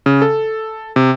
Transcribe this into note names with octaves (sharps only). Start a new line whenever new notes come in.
C#3
A4
C3